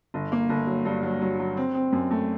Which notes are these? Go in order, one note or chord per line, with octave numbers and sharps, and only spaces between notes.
G1
A#3
G1
F#3
G2
F#3
F#3
F#3
C4
C4
F#2
A3